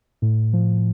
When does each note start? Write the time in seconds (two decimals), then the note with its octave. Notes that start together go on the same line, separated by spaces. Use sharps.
0.22 A2
0.53 F3